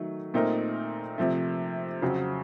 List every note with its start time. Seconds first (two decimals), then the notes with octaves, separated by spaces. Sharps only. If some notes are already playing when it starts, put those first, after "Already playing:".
Already playing: D#3 F#3 A3
0.34 A#2 A3 C4 D#4 A#4
1.18 C3 F3 A3
2.02 F2 C#3 F#3 C4 F#4